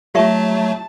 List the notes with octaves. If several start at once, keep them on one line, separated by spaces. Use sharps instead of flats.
F#3 A3 G4 E5 A5 C#6